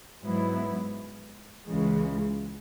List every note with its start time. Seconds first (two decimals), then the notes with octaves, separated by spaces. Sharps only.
0.22 G#2 F#3 B3 E4
1.66 C#2 C#3 E3 G#3